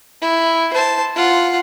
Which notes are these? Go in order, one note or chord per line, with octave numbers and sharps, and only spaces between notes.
E4
C5 A5
F4 F#5